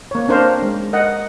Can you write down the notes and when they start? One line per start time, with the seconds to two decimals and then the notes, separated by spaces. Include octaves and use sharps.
0.11 A#3 C#5
0.28 C4 D4 A#4 C5 F5
0.62 G#3
0.93 A#4 D#5 F#5